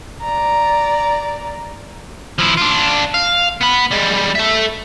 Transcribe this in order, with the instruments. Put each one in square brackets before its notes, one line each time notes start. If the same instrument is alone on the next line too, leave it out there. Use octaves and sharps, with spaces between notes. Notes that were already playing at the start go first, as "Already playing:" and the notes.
[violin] D5 A#5
[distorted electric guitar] F3 E4
D4 F4
F5
B3 B5
G3 G#3
A4 E5